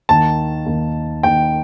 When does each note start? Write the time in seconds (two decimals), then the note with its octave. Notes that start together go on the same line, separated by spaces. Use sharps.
0.09 D#2 D#3 A5
0.66 D#2 D#3
1.23 D#2 D#3 G5